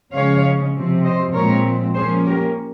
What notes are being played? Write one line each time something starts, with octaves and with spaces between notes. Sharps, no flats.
C#3 F3 G#3 C#4 C#5 F5
C3 F3 C4
C5 D#5
A#2 F3 G#3 C4 A#4 C#5
F3 A#3 C#4 G#4 C5
G4 A#4